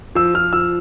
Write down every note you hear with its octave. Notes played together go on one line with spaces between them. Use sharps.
F3 E6
F3 F6
F3 E6